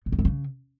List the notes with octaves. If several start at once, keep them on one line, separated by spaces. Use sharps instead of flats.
A#2
E2
F#2
C#3